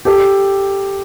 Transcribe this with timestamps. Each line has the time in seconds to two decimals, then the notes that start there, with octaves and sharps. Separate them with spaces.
0.05 G4 A4